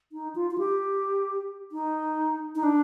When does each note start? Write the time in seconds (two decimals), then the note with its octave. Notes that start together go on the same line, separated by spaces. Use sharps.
0.12 D#4
0.35 F4
0.51 F4
0.58 G4
1.72 D#4
2.55 D#4
2.63 D4